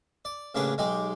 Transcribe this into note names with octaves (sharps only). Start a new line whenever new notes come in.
D5
A1 C#3 A#3 D4 G#4 B4
B1 G#3 D#4 G4 G5 D6